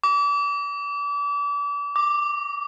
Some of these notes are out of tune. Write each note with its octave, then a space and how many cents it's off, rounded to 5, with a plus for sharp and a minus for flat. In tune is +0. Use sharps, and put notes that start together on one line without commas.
D6 -35
D6 +5